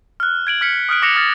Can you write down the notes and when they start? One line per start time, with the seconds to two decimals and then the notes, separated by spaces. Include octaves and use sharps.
0.20 F6 F#6
0.47 G#6 D7 F#7
0.61 F6 B6 C#7
0.89 D#6 F6 F#6 D7
1.02 D6 A#6 C#7 E7 F7
1.16 D#6 F6 A6